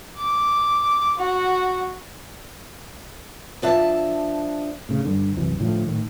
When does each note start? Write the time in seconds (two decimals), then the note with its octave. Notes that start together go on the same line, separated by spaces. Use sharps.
0.18 D6
1.17 F#4
3.62 F3 D4 E5 A5
4.89 A2 C#3
5.05 G2 D3
5.37 C2 F#2 E3
5.60 A2 D3 F3
5.88 A2 D#3